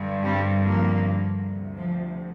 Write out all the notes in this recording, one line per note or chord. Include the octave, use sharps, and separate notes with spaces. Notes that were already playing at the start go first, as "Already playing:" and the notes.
Already playing: G2 D3
G3 C4
F3 A#3
D2 C3
F3